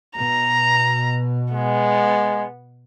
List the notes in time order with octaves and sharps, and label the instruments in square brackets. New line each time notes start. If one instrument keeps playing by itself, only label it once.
[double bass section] B2 [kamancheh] A#5
[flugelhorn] G#3 [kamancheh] B3